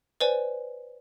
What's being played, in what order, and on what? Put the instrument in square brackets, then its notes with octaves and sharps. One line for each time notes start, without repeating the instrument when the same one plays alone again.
[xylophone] B4 C5 D5 G#5